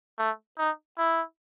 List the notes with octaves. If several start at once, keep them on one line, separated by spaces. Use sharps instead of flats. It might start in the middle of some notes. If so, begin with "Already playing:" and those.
A3
D#4
E4